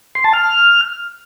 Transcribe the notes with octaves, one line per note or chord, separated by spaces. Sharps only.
C6
A5
F6